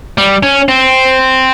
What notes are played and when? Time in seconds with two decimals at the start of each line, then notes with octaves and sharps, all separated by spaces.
0.18 G3
0.43 C#4
0.68 C4